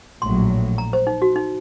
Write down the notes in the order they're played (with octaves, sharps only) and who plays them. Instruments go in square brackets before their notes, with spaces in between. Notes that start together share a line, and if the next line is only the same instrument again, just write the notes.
[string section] A#1 A2 F#3 [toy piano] C6
[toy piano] A#5
C5
D#4
F#4
D#4